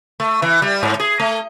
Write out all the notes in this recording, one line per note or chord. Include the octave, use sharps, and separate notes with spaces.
A3
E3
G3
G#2
G#4
A3